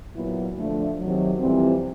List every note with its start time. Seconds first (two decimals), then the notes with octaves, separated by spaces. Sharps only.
0.15 A#2 F#3 B3 E4
0.56 D3 F3 A3 D4
0.98 C3 D#3 F#3
1.40 F2 C3 E3 G3 C4